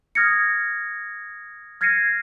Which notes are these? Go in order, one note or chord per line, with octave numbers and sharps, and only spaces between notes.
D#6 F6 G#6 A#6 C#7
F6 G#6 A#6 C7 C#7 D#7